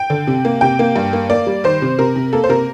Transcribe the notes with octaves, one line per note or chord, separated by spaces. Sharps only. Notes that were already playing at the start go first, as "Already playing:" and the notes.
Already playing: G5
D3
C3
A#3
C3 G5
A#3
G2
A#3
A#3 D5
G3
D#3 C5
C3
C3 A#4
C3
A#3 A4
C5
C3 A#4